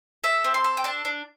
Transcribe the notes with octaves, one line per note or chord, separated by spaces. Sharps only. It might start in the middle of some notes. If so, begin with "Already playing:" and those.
A4 E5
C4
C6
A4
G5
D4 A5
D4